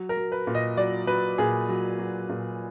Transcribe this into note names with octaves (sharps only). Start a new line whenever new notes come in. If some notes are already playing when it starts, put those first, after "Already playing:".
Already playing: F#3
A#4
F#3
B4
A#2
D#5
F#3 D5
F#3 B4
A#2 G#4
F#3
F#3
A#2